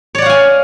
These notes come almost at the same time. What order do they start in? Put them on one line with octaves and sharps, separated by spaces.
C#5 D5 F#5 F5 G#5